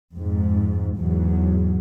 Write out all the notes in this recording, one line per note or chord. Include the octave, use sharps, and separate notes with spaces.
F2 G#2
E2 G#2 F#3